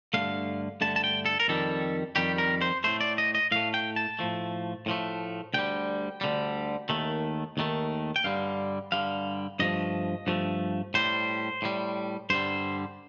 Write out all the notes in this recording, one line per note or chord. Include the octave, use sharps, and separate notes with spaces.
G2 D3 A3 F5
G2 D3 A3 A5
A5
G5
A4
A#4
F2 D#3 G3 A4
F2 D#3 G3 G4
A#4
C5
A2 A3 C5
D5
D#5
D#5
A2 A3 F5
G5
A5
A2 F3 A3
A2 F3 A3
D2 D3 G3 G5
D2 D3 G3
D#2 D#3 A3
D#2 D#3 A3
G5
G2 D3 G3 F5
G2 D3 G3 F5
G2 F3 A3 D#5
G2 F3 A3
A2 G3 C5
A2 G3
G2 D3 G3 C5